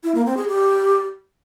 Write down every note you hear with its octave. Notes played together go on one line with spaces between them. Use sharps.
E4
A#3
C4
G#4
G4